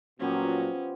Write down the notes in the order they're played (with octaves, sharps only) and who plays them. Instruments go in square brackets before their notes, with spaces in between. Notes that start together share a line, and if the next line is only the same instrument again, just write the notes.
[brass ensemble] A#2 F#3 [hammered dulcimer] F3 B3 G4 [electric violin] C#4